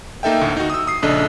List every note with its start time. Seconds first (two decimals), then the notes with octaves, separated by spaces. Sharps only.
0.23 A#3 D#4 A4 E5 G5
0.41 D2 A2
0.57 D#4 F#4
0.70 D#6 E6
0.87 D#6 C7
1.03 A#1 C#3 D4 A4 D#5